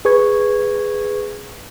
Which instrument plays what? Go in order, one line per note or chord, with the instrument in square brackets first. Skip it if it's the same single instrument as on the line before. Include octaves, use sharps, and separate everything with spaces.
[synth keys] G#4 B4 C#6 G#6